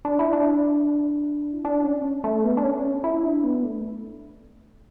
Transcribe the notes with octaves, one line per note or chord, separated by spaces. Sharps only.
D4
E4
D4
E4
D4
C#4
A3
B3
D4
C#4
E4
D4
B3
A3